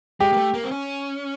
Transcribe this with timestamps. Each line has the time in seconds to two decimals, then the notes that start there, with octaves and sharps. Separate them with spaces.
0.20 G#3 G4
0.33 A#3
0.37 A3
0.54 A#3
0.64 C4
0.71 C#4